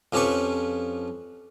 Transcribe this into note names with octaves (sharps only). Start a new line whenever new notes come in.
F2 F3 C#4 G4 B4 C#6